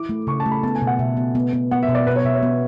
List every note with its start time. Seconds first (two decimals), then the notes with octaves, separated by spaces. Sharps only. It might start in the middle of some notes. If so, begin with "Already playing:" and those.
Already playing: E4 D6
0.09 A3
0.27 C#3 C#6
0.40 A5
0.46 A3
0.51 B5
0.63 B3 A5
0.75 G#5
0.82 B2
0.87 F#5
0.99 B2 E5
1.17 B3
1.35 B3
1.53 B3
1.71 B3 F#5
1.83 E5
1.89 B2
1.95 D5
2.07 B2 B4
2.16 C#5
2.24 B2 E5
2.34 C#5
2.43 B3